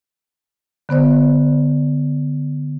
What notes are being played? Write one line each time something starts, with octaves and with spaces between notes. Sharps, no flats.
D3 B3 C5 D5